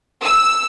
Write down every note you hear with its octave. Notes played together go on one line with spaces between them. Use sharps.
E6